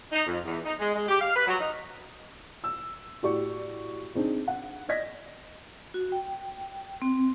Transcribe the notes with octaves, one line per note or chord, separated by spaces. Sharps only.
D#4
F2
E2
D#4
G#3
G#3
G4
F5
B4
F#3
D#4
E6
A2 F#4 G4 D5 C#6
C4 D4 D#4 G#4
F#5
D5 D#5 G#6 A#6 B6
F#4
G5
C4